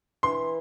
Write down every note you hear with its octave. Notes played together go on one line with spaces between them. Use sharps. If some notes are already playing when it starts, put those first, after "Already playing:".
E3 C6